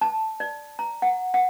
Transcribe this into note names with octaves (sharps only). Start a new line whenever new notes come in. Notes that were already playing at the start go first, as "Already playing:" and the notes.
A5
D5
A#5
F#5
F#5